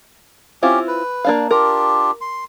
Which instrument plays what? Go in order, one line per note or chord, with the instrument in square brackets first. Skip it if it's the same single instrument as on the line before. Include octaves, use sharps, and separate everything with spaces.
[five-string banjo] C4 E4 F4 [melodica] C#4 G4
[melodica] B4
[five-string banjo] A#3 D4 F5
[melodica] D4 F4 G4 [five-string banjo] A#4
[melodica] C6